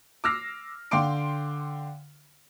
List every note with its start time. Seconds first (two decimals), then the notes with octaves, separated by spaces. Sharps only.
0.24 D6 E6 F6 A#6 C7
0.91 D3 F5 G5 C6 D6 D7